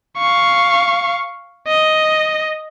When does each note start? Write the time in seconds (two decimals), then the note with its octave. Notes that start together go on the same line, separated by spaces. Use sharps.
0.18 F5 C#6
1.68 D#5